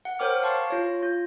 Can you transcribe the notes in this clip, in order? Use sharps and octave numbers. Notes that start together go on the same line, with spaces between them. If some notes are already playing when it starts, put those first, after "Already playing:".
F#5
A#4 C5 C#5 G5 D6 F6
F5 A5 C6 C#6
F4 C#5
F4